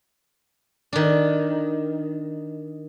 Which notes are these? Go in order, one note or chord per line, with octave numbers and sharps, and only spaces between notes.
D#3 D4